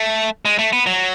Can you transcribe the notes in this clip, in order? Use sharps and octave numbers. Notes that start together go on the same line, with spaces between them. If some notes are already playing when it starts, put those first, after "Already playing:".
Already playing: A3
G#3
A3
B3
F#3